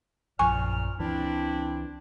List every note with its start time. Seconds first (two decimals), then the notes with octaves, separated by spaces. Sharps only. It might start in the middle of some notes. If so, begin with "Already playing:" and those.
0.39 A#1 F#2 A#2 F3 G#5 C#6 F6
0.99 C#2 E3 C4 D4 E4